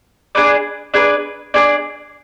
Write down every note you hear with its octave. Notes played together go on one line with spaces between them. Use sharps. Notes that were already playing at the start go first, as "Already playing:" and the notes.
D4 G#4 B4 D5
D4 G#4 B4 D5
D4 G#4 B4 D5